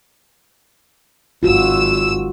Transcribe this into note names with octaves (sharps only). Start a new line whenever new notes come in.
G#1 F4 F#4 E6